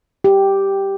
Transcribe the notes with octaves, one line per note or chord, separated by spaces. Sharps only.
G4